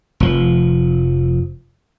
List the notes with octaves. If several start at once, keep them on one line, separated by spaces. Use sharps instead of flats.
F1 F3